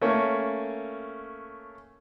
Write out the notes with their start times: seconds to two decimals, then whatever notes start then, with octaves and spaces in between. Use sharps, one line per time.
0.02 A3 A#3 C#4 C#5